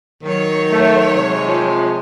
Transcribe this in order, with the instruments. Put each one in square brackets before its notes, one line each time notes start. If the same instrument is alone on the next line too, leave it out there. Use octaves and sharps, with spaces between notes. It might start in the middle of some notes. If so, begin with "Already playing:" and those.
[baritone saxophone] D#3 [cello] F#3 C#5
[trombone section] A3
C3 G#3
[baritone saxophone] F3